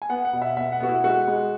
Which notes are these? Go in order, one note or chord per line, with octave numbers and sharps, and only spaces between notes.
G#5
B3 F#5
F#5
B2
E5
B3 E5
F#5
B3 F#4
E4
G#3 F#4
G#3